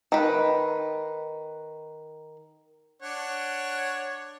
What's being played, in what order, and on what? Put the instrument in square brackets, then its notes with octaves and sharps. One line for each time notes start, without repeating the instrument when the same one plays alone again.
[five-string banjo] D#3 B4
[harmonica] D4 C#5 F#5